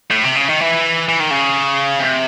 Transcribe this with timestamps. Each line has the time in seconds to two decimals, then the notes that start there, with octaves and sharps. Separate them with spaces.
0.11 A2
0.25 C3
0.36 C#3
0.49 D#3
0.61 E3
1.08 E3
1.20 D#3
1.31 C#3
2.00 C3